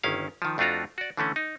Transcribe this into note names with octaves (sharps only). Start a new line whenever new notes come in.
G1 D#3 C#4 E4 F5
D#3 F3
F2 A3 D4 F4 F#4 A#5
F#4 D5
D3 E3 A3 C#4
D#4